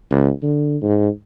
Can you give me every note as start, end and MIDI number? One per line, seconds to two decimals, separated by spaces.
0.11 0.31 37
0.43 0.77 50
0.82 1.09 44